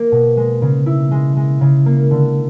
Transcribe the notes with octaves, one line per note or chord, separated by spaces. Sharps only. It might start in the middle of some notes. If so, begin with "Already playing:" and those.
Already playing: A#3
B2
G#3
C#3
E4
G#3
G#3
C#3
A#3
D3